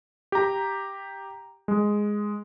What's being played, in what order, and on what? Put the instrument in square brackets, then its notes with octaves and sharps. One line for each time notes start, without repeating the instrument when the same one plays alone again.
[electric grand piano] G4 A#5
G#3